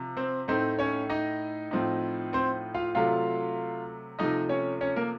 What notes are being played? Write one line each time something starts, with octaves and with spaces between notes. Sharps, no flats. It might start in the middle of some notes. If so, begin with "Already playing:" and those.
Already playing: C3 F3
C4 C5
A2 A3 C4 D#4 C5
C#4 C#5
D#4 D#5
A2 F3 C4 D#4
C4 C5
F4 F5
C3 F#3 A3 F4 F5
C3 F3 A3 D#4 D#5
C#4 C#5
C#4 C#5
A#3 A#4